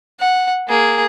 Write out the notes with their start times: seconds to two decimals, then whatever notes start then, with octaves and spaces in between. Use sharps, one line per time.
0.20 F#5
0.68 A#3 G#4